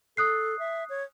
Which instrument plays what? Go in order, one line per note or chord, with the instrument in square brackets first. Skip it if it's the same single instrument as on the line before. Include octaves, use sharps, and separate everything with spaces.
[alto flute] A4 [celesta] D#6 F#6 C7
[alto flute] E5
C#5